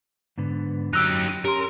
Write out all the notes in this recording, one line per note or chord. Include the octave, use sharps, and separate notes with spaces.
G#2 D3 B3
F#2 F#3 C#4 D#4 G4 E6 F#6
D#7
C#4 G4 A#4 C6